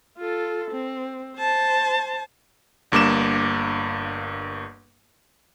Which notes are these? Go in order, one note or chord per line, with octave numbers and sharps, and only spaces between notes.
F4 A4
C4
C5 A5
G1 G2 A#3 D6 E7